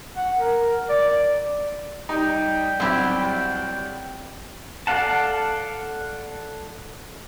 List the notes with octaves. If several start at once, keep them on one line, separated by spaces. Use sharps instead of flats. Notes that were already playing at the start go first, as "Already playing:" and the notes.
F#5
A#4
D5
G3 D#4 G5
B1 C4 E4 G4
A4 D5 F5 F#5 A5